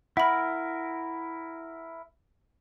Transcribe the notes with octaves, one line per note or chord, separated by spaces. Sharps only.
E4 A#4 E5 F#5 B5